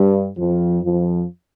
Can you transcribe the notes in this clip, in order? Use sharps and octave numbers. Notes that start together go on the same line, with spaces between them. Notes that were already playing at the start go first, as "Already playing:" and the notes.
Already playing: G2 G3
F2 F3
F2 F3